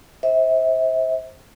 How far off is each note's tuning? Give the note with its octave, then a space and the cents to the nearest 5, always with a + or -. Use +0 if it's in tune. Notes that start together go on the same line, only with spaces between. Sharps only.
C5 +10 E5 -30